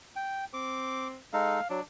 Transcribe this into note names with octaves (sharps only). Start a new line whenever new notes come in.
G5
C4 D6
G#3 D#4 A4 F5
F#3 D4